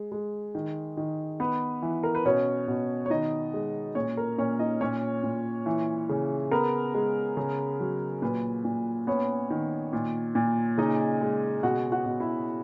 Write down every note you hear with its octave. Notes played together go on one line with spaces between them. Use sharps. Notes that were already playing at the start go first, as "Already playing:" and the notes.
Already playing: G#3
G#3
D#3
D#3
B3 B4
E3
A#4
B4
B2 C#4 C#5
B2
C#5
D#3 D#4 D#5
G#3
A#2 C#4 C#5
A#4
A#2 C#4 C#5
D#4 D#5
A#2 C#4 C#5
A#2
E3
C#3
B3 A#4
G#3
C#3
F#3
A#2 B4
A#2
B3 C#4 C#5
D#3
A#2
A#2
C#3 D#4 D#5
G#3
B2 F#4 F#5
F#4 F#5
B2
E4 E5